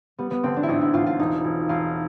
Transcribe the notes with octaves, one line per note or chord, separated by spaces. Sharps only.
G3 B3
B3
D3 C4
D4
E4
A1 D#4
E4
A1 F4
F4
E1 D#4
E1
E1 F4